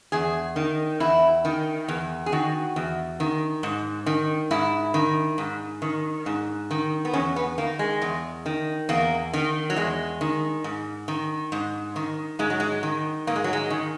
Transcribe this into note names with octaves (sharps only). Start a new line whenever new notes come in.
E2 G#4
D#3
E2 E4
D#3
E2
G#4
D#3 F#4
E2
D#3
G#2
D#3
G#2 E4
D#3
G#2
D#3
G#2
D#3
B3
E2 C#4
B3
D#3 A#3
G#3
E2
D#3
E2 A#3
D#3
F#3
E2 G#3
D#3
G#2
D#3
G#2
D#3
G#2 G#3
F#3
G#3
D#3
G#2 A#3
G#3
F#3
G#3
D#3